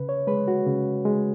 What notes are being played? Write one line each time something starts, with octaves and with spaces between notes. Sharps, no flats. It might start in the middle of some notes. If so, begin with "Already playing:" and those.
Already playing: C#3 B4
C#5
G#3 B4
F#4
C#3
G#3